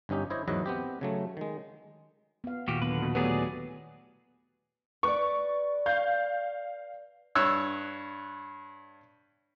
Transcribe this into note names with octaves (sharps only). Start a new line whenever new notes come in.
G1 G2 C#4 D#4 G4
E4 C5 C#5 D#5
E2 G#2 F#3 B4 D#5 E5
B3 C4 G4
C#3 F#3 A3
D#3 G#3
B3 F5
D#2 A#2 F#4 G4
D3 F#3 B3 B4
B2
E3 F#3 A3 B3 G4 G#4 D5
B4 D5 C#6
F5 G6
G2 C#5 E6 F#6